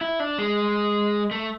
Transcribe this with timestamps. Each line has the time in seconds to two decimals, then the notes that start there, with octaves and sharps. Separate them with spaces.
0.01 E4
0.20 D4
0.39 G#3
1.31 A3